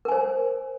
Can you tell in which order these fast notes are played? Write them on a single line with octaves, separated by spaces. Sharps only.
A#4 G#5 C5